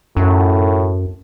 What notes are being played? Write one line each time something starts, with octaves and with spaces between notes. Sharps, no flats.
F#2 A2